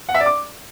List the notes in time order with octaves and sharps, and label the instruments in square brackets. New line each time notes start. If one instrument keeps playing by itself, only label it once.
[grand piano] F#5
E5
D5
D6